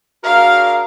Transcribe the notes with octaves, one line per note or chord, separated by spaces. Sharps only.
D4 F#4 G#4 A#4 F5